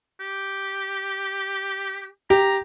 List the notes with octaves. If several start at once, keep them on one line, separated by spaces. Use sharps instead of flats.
G4
G4 A#5